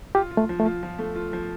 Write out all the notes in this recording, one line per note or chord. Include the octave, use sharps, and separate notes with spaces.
F4 G4
F4
A3
F3
A3
F4
F3
A3
F4
F3